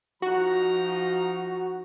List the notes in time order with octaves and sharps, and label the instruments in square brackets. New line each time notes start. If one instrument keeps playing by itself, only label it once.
[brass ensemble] F3 D#4 A#5 [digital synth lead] F#4